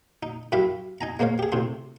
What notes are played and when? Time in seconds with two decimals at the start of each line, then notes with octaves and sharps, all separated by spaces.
0.23 D#4
0.52 F#2 E4 G4 E5 F5 B5
1.01 D#4 G#5 A#5
1.19 G#3 A#3 C5 C#5 F5
1.39 G4 G#4
1.52 A2 C3 C6